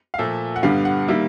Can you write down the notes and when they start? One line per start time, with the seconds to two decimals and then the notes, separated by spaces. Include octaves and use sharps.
0.14 F5
0.18 A#2 F3 A3 E5
0.56 F#5
0.63 G2 D3 G3 B3 F5
0.85 F#5
1.08 D#3 G3 A#3 E5